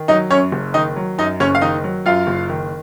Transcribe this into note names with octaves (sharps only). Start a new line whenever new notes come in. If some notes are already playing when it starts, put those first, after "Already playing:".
Already playing: D#3
F#3 D#4 D#5
F#2 C#4 C#5
F#1
D#3 D#4 D#5
F#3
F#2 D#4 D#5
F#1 C#4 C#5
F5
D#3 D#4 D#5
F#3
F#2 F4 F5
F#1
D#3